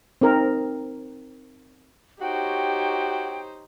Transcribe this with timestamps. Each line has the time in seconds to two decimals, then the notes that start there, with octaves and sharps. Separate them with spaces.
0.21 C4 D#4 A#4
2.21 D#4 F#4 G4 C5 C#5 G5